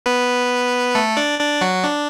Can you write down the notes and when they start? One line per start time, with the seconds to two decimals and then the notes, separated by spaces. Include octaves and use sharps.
0.06 B3 B4
0.95 A3 A4
1.17 D4 D5
1.39 D4 D5
1.61 F#3 F#4
1.84 D4